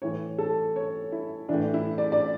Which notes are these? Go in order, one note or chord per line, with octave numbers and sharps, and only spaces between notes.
A2 E3 C#5
A4
C#5
E4
A2 E3 D4
E4
D5
D5